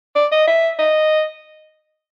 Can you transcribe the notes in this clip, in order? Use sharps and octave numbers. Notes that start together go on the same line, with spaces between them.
D5
D#5
E5
D#5